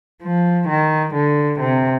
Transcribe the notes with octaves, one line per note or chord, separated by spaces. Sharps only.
F3
D#3
D3
C3